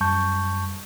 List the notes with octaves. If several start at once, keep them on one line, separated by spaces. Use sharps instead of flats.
F#2 G3 A5 C#6 G6